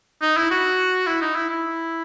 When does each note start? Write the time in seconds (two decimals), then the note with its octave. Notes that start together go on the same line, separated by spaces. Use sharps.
0.22 D#4
0.37 E4
0.51 F#4
1.07 E4
1.21 D#4
1.36 E4
1.50 E4